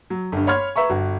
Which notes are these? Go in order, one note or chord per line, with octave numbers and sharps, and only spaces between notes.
F#3
G1 G2
C#5 B5 C6 F6 G#6
B4 E5 A#5 C#6
G1 F#4